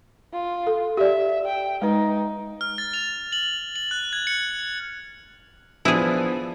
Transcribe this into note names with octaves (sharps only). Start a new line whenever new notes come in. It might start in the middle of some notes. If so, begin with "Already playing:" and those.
F4
A4
G4 D5 E5
G5
G#3 D#4 B4
F6
A6
F7
F#7
F#7
F#6
G#6
C#7
F3 B3 D4 E4 G#4